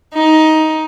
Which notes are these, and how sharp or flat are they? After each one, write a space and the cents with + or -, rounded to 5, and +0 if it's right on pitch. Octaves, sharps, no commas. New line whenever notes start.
D#4 +10